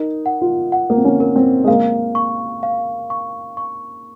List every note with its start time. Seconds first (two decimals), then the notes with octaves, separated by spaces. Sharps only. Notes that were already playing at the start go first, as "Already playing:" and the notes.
Already playing: D#4 A#4
0.26 F#5
0.41 F4
0.72 F#5
0.90 A#3
0.97 C4
1.05 C#4
1.20 A#4
1.36 C4
1.64 G#3
1.68 A#3 F5
2.15 C#6
2.63 F5
3.10 C#6
3.57 C#6